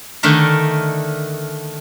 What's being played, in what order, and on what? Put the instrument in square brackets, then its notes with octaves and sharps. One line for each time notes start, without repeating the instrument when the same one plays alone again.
[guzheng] D3 D#3 A3 A#4